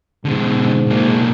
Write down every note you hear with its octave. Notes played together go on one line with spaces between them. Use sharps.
G#2 B2 D3
B1 A#3